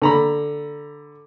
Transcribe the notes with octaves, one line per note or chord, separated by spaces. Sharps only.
D3 A#5 B5